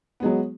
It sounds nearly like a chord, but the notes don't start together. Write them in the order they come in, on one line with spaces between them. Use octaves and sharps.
B3 G#3 F#3